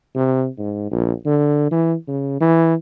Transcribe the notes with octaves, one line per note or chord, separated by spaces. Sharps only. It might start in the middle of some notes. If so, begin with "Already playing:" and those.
C3
G#2
A#1
D3
E3
C#3
E3